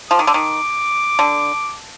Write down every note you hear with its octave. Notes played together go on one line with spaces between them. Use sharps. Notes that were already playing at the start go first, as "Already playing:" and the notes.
F3 D6
D#3
D3
D#3
D3